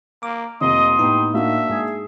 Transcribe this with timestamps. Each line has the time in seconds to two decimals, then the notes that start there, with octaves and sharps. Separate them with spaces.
0.23 A#3 D6
0.61 F1 A#3 D#5 C6 D#6
0.99 A2 B3 D#4 G4
1.34 A#3 D4 F#4 E5
1.70 G#2 G#4